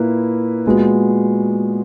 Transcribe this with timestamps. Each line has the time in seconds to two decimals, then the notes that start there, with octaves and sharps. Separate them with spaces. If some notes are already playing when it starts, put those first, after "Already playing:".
Already playing: A#2 A#3 E4 B4
0.66 A#2 G#3 B3 F#4